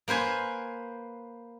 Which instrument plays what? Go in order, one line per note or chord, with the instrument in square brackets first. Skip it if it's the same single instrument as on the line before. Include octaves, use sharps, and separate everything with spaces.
[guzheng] A#3 B4 C5 G#5